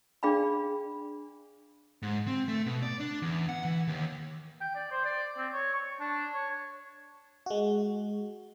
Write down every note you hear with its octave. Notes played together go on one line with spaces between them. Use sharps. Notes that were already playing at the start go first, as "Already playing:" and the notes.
D4 G#4 D5 F5 G5 B5
G#2
C4
A3
B2
D5
D4
E2
F#5
E3
D#2
G5
D5
C5
D5
C4
C#5
C#6
D4
C#5
G#3 F#4